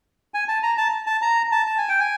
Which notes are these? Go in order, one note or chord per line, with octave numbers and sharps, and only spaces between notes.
G#5
A5
A#5
A5
A5
A#5
A5
A5
G#5
G5
G#5